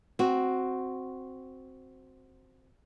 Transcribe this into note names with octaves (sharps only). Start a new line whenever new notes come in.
C4 F#4